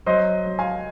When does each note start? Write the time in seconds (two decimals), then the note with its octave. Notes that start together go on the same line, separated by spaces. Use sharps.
0.06 F#3 C5 D#5
0.46 F#3
0.59 F5 G#5